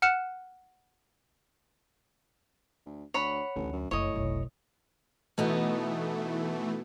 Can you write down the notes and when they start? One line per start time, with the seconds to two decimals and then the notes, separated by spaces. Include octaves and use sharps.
0.02 F#5 F6 F#6 C#7 E7
2.86 D2
3.14 D2 C#5 F#5 B5
3.56 A1 D2
3.73 F#2
3.91 F#1 A2 E4 C#5 D#5
4.13 F1 B1
5.38 B2 E3 A3 B3 D#4